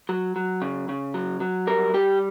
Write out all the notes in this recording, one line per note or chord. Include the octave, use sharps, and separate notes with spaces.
F#3
F#3
C#3
C#3
F#3
F#3
G3 A#4
G3 G4